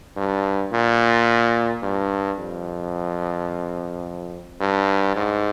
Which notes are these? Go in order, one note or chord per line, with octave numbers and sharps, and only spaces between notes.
G2
A#2
G2
F2
G2
G#2